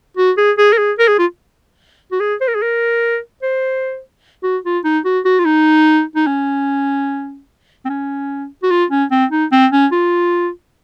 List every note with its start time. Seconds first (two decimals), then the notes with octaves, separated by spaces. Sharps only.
0.17 F#4
0.37 G#4
0.58 G#4
0.73 A#4
0.78 G#4
0.98 A#4
1.08 G#4
1.19 F4
2.12 F#4
2.20 G#4
2.41 C5
2.48 A#4
2.55 G#4
2.62 A#4
3.43 C5
4.43 F#4
4.64 F4
4.84 D#4
5.05 F#4
5.25 F#4
5.39 F4
5.45 D#4
6.15 D#4
6.27 C#4
7.85 C4
7.89 C#4
8.63 F#4
8.71 F4
8.90 C#4
9.11 C4
9.31 D#4
9.52 C4
9.72 C#4
9.92 F4